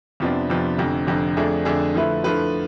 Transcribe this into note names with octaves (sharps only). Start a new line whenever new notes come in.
F2 C3 F3 B3 D4
F2 C3 F3 B3 D4
F1 F2 D3
F1 F2 D3
F2 D3 A3 D4 G#4
F2 D3 A3 D4 G#4
D3 F3 A3 E4 B4
D3 F3 A3 E4 B4